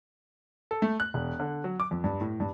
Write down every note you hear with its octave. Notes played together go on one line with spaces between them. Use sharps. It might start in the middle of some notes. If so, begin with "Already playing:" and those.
A4
A3
F#6
E1
D3
F#3
D6
F2
G2
A2
G2